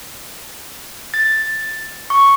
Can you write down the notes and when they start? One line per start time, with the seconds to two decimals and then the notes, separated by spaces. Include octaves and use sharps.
1.14 A6
2.10 C#6